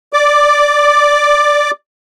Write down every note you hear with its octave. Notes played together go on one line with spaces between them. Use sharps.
D5 D6